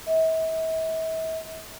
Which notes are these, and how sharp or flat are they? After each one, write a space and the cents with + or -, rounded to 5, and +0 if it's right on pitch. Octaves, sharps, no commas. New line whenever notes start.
E5 -40